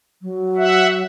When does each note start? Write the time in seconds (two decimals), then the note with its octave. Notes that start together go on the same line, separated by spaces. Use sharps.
0.22 F#3
0.57 E5 F#5